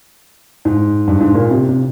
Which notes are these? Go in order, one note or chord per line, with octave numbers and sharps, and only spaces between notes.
G#2
G2
G#2
A#2
C3
C3